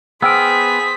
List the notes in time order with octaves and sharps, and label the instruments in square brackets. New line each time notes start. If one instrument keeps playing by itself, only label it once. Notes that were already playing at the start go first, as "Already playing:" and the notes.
[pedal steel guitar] B3 G5 F6 [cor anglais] G#4 [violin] C5 B6 [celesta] E6 D7